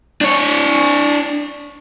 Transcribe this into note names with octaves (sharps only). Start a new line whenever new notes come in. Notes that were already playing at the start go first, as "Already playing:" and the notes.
D4 C#5